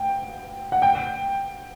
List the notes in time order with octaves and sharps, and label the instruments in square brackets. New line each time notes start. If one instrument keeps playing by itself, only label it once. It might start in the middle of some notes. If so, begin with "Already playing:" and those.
Already playing: [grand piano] G5
F#5
G5